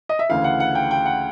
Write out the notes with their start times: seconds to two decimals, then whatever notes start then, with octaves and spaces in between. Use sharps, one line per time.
0.09 D#5
0.19 E5
0.29 D2 C#3 E3 F5
0.44 F#5
0.60 F#5
0.75 G5
0.91 G5
1.06 F#5